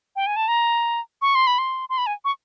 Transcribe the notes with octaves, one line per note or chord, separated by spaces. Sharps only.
G5
G#5
A5
A#5
C#6
C6
B5
C6
C6
B5
G#5
C#6